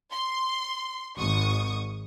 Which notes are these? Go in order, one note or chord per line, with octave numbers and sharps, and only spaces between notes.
C6
G#1 C#6 D#6